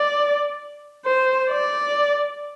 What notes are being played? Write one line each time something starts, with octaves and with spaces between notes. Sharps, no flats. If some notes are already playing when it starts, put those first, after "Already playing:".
Already playing: D5
C5
D5